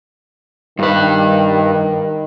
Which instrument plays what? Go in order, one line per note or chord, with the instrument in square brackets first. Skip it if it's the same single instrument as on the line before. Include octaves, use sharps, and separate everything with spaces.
[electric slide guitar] G2 B4 [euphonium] D#3